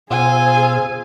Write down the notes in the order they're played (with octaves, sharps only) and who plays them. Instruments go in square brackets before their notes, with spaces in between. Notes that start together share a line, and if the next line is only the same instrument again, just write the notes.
[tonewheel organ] B2 C5 E6 [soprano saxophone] F4 [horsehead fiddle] G#4 [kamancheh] G#5